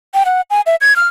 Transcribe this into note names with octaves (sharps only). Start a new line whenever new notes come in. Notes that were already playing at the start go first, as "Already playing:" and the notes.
G5
F#5
G#5
E5
G#6
F6